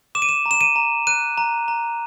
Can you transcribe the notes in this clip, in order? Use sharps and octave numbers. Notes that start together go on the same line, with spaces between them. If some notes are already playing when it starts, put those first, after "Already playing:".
D6 E7
D#7
E7
A#5
E7
D#7
A#5
F#6 D#7
A#5
A#5